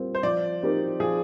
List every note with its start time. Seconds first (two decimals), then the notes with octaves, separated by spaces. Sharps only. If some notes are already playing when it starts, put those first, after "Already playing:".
Already playing: G3 C4 F4 A#4
0.15 C5
0.23 F3 D5
0.63 C4 D#4 G4 A#4
1.00 F3 G#4